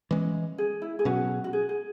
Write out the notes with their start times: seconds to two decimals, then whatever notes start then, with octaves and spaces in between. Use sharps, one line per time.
0.11 E3 G#3 C#4
0.58 G#4
0.82 E4
0.99 G#4
1.05 B2 F#3 C#4 F#4
1.44 F#4
1.53 G#4
1.69 G#4